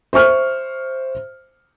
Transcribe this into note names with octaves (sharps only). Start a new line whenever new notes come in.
C5 E5 C#6 F6